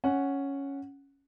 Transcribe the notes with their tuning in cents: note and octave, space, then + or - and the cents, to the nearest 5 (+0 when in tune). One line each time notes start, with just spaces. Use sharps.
C#4 +0 F#5 +0